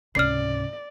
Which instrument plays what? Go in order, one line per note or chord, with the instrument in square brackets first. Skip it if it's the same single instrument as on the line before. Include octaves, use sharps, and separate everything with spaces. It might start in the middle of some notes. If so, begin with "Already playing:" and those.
[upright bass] C#2 G#2 [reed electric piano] C3 C#4 [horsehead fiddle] D5 [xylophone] F6 C7